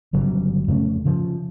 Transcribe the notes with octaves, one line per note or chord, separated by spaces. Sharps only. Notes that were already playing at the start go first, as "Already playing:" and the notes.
G1 C#3 F#3 G3
F2 C#3 A3 C#4
C#3 F3